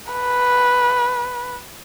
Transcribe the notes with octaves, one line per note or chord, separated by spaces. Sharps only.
B4